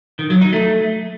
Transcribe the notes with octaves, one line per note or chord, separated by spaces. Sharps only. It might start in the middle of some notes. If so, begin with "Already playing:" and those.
D#3
F#3
D#4
A3